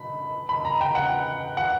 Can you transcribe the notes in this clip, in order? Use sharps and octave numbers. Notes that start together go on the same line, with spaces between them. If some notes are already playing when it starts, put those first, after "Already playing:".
Already playing: B5
B5
A#5
G5
F#5
F#5